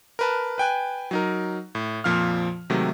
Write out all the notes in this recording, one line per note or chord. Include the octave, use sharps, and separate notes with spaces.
A#4 B4 A5
B4 G5 G#5 F#6
F#3 D#4 A#4
A2
F2 A#2 F3 F5 F6
C3 D#3 F#3 G#3 A3